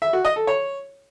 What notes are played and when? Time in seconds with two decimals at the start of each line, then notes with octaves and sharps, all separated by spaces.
0.02 E5
0.13 F#4
0.25 D#5
0.36 A4
0.47 C#5